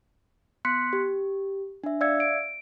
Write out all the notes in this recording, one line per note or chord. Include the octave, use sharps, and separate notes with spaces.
B3 C6 F#6 B6 C#7
G4
D4 E5
D5 E5 F5 E6 G#6 C#7
D7